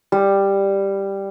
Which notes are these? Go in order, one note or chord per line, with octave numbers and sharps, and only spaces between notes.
G3